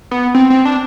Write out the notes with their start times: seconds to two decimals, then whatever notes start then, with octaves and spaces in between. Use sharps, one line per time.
0.11 B3
0.35 C4
0.50 C4
0.65 D4